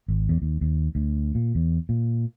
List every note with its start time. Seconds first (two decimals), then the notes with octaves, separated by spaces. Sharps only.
0.08 G#1
0.29 E2
0.42 D#2
0.61 D#2
0.95 D2
1.35 A#2
1.55 E2
1.89 A#2